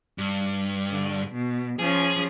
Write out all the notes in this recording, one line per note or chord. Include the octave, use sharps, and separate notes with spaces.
G2
D3
B2
F3 C#4 G#4